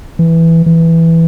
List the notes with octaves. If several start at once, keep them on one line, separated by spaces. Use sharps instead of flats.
E3
E3